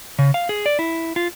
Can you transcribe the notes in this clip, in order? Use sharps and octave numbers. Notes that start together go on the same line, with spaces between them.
C#3
F5
G#4
D5
E4
F4